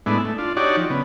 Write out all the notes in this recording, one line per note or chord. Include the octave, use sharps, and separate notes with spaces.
A2 G#3 B3 D4 E4
A3
D4 F4
D4 D#4 F#4 G4 C#5 D5
F3
C#3 B3